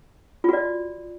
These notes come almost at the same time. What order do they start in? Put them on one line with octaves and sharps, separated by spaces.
F4 F#4 D5